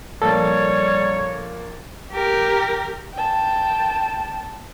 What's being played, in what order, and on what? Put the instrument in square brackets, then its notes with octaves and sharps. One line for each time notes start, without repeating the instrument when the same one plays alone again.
[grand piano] A#1 A#3 A6 [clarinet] G3 [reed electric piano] A4 [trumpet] C#5
[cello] G4 A#4
[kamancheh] G5 A5